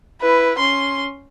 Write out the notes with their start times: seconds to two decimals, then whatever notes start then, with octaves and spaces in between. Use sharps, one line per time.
0.21 E4 B4
0.58 C#4 C6